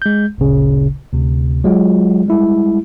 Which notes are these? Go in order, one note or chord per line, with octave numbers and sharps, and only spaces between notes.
G#3 G6
G1 D2 A#2 C#3
D2 C3
F#3 G#3 F4
G3 G#3 E4